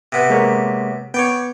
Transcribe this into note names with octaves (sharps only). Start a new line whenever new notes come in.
C3 B3
G#3 A#3 C#5
B3 C#5 D5 G5